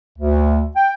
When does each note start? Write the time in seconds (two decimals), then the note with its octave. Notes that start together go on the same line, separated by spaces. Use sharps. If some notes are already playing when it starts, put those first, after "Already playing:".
0.19 D2
0.76 G5